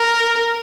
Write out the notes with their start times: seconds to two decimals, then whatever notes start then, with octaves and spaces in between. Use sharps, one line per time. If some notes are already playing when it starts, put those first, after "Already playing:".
Already playing: A#4